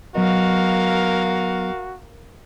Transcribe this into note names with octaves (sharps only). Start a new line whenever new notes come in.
F#3 B3 F#4 A#4 D#5 F5